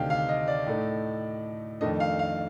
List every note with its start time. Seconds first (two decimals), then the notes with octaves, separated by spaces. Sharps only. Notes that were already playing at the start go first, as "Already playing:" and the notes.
Already playing: D2 C3 D#3 A3 D4 F5 G5
0.10 F5
0.29 D#5
0.48 D5
0.67 A2 A3 D#4
1.81 F2 D#3 A3 D4 D#5
2.00 F5
2.19 F5